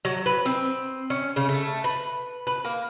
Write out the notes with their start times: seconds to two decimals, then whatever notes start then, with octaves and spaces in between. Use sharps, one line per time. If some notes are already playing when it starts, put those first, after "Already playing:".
0.05 F#3
0.26 B4
0.45 C4
1.10 C#4
1.36 C#3
1.49 A3
1.84 B4
2.47 B4
2.65 A#3